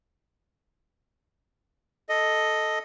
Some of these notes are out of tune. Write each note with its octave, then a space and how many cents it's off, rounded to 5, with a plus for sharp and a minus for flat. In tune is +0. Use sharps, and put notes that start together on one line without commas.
A4 +0 D#5 +0